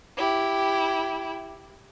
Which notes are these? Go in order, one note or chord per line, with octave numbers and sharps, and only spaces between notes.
E4 G4